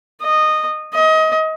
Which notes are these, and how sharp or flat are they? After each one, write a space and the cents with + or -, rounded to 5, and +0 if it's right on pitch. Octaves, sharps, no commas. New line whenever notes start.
D#5 -15
D#5 +25